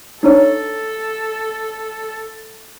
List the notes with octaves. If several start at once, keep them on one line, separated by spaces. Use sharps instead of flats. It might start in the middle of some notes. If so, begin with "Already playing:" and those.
D4 D#4 A4 C#5